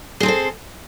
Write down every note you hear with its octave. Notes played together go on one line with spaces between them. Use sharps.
C4 G#4 A4 C5